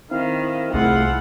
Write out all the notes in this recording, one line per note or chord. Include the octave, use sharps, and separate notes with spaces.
D#3 C4 E4 F5
C2 A3 E4 F4 G#4 F#5